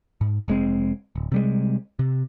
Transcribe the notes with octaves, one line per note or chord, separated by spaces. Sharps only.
G#2
F1 G#3 C4
D1
C3 G3 G#3
C3